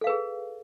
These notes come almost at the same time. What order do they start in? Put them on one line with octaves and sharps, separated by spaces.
A4 F5 B4 G#4